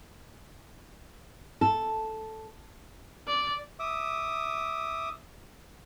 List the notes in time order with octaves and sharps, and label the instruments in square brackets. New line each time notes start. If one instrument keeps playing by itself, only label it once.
[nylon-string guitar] A4
[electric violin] D5
[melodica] E5 D6 D#6